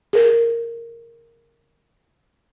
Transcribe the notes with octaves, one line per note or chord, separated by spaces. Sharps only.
G#4 A#4